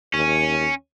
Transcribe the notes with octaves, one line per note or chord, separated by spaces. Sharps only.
D#2 C#4